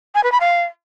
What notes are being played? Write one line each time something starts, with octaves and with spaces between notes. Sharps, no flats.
G#5
B4
B5
F5